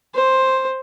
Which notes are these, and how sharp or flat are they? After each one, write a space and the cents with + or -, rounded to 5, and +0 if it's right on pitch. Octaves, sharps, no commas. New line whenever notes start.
C5 +5